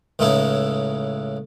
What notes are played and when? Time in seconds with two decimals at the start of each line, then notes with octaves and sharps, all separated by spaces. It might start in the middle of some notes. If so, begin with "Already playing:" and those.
0.19 C#2 A2 C#3 D#4 E4 A4